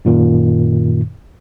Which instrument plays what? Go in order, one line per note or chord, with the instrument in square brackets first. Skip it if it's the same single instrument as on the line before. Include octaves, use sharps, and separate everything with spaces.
[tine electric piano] F#2 A#2 D#3